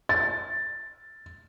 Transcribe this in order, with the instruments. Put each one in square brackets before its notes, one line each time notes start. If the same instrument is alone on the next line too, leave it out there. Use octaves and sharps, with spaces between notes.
[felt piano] A6